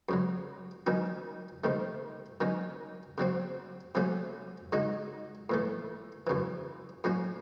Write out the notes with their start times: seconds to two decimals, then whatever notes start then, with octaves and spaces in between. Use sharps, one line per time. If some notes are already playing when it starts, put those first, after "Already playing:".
0.09 F#2 C#3 F#3
0.86 D#3 F#3 C#4 F#4
1.64 C3 D#3 A3
2.41 D#3 F#3 C#4
3.18 C#3 F#3 C4 F#4
3.95 C3 F#3 A3 C#4 F#4
4.72 C#3 G#3 D#4 F#4
5.50 A2 E3 A3
6.27 F#2 C#3 E3
7.04 A2 F#3 C#4 F#4